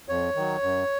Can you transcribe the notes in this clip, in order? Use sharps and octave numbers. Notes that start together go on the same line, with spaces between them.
F2 C#5
D#3 F#3
F#2